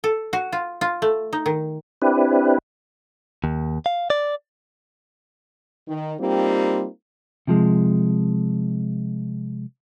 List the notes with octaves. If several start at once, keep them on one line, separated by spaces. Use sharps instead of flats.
A4
F#4
F4
F4
A3
D#4
D#3
C4 D4 E4 G4 B4
D#2
F5
D5
D#3
G3 A#3 C4 D#4 F4 G4
C3 F3 G#3